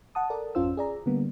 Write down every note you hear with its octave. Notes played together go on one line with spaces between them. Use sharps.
F#5 A5 D#6
A4 A#4 D5
G#1 F2 C#4 F4 C5 E6
G#4 D5 A#5
D3 G3 A#3 B3